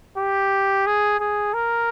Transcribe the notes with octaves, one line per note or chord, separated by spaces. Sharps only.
G4
G#4
G#4
A#4